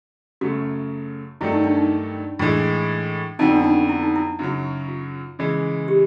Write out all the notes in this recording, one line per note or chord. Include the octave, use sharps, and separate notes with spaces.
F#2 C#3 F#3 A3 F#4
G2 D#3 F#3 A3 E4
D#4
D4
D#4
A2 E3 G#3 D4
F2 D3 F#3 B3 D#4
D4
D#4
E4
D#4
E4
F#2 C#3 F#3
F4
C#3 E3 G#3
G4